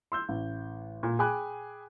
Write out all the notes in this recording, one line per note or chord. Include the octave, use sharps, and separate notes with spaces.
C6 E6 G6
A1
A#2
G#4 G5 G#5 B5 D6 F#6